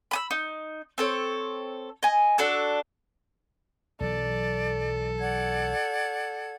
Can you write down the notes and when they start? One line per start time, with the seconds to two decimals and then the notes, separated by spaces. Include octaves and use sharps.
0.11 B5 D#6 E6
0.31 D#4
0.98 C4 A4 C#5
2.03 D#5 G#5
2.38 D4 F#4 A4 E6
4.00 B1 E3 F#3 A4 D5
5.19 D5 F#5 G#6